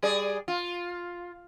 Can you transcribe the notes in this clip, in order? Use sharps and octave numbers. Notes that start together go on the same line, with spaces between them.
G3 G#4 D5
F4